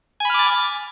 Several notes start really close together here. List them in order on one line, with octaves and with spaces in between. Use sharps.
G#5 B5 F6 D6 A6